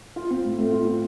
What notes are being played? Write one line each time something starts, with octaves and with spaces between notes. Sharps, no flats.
F4
C4
A2
A3
F4
C4